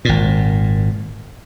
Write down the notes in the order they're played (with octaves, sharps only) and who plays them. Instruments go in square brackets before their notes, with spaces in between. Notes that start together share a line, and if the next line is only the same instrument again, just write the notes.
[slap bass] G#1 A#2